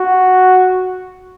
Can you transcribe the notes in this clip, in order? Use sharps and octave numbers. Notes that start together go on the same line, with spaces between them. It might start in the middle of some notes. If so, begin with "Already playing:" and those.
Already playing: F#4